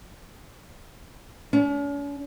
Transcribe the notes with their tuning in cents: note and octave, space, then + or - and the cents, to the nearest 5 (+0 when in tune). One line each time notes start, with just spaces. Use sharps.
C#4 +45